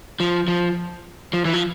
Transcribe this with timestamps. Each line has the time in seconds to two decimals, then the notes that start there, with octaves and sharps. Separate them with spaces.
0.20 F3
0.48 F3
1.33 F3
1.45 E3
1.53 F3